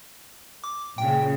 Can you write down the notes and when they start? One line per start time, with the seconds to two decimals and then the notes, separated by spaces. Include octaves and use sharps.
0.64 D6
0.98 A#2 C#3 G5